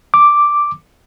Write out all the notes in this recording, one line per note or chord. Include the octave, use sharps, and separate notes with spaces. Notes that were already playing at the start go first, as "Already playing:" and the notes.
D6